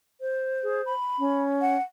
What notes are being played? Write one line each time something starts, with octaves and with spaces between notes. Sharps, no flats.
C5
G#4
B5
C#4
F#5